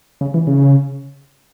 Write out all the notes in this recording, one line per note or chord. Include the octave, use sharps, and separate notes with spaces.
C#3
E3
C#3